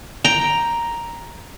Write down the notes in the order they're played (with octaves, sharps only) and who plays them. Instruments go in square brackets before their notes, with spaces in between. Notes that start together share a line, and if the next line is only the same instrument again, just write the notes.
[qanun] G5 A#5